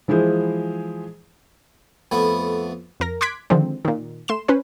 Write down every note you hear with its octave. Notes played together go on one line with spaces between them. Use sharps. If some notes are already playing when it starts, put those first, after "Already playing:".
E3 F3 G#3 E4 G#4 C5
F2 A3 B3 E4 F#5
F2 A#4 A#6
C6 D6 F#6 G#6 B6 D7
D3 D#3 F3 G#3 C4
A#2 D#3
A3 C6 E7
C#4 B4 C5